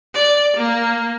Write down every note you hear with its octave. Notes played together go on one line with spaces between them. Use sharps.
D5
A#3